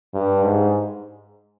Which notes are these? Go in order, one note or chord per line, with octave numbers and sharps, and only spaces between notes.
G2
G#2